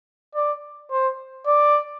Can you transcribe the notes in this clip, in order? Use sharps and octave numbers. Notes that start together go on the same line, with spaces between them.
D5
C5
D5